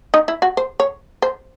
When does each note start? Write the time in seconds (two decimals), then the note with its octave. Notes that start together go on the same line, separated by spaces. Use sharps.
0.14 D#4
0.28 E4
0.42 F#4
0.57 C5
0.80 C#5
1.22 C5